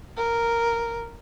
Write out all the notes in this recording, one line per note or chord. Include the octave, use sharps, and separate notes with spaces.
A#4